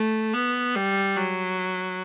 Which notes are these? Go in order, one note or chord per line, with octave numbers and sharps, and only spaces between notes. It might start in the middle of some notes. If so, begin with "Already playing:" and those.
Already playing: A3
B3
G3
F#3